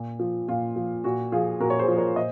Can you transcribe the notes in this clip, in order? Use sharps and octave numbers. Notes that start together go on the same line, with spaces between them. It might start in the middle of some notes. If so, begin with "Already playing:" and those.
Already playing: A#2
F3
A#2 F4
F3
A#2 F#4
F3 F4 G#4
A#2 F#4 A#4
C#5
G#4 C5
F3
A#4 C#5
A#2 C5 D#5